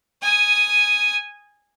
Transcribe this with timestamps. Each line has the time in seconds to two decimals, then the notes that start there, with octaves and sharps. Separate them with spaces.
0.22 G#5 D#6